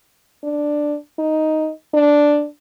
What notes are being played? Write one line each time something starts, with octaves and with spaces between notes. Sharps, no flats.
D4
D#4
D4